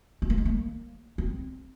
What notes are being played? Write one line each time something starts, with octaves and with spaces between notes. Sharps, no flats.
C4
A#3
G#3
A#3
C4